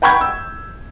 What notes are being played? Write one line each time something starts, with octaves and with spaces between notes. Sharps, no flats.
F#5 G5 B5 C#6 G6 G#6
E6